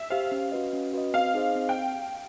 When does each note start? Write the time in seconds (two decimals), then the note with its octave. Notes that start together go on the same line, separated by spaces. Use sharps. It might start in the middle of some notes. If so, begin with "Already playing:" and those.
Already playing: E5
0.10 G4 C5 F5
0.32 C#4
0.52 F#4 B4 D#5
0.73 C#4
0.93 F#4 B4 D#5
1.14 C4 F5
1.34 D#4 G#4 C5 D#5
1.55 C4
1.69 G5